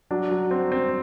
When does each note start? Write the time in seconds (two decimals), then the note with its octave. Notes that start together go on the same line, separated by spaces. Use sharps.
0.11 F#3 D4
0.31 F#3
0.51 C4
0.72 C4